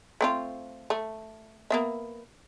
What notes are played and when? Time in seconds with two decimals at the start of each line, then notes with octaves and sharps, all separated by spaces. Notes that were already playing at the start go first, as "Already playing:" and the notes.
0.21 A3 C4 F4
0.90 A3
1.70 A#3 B3 E5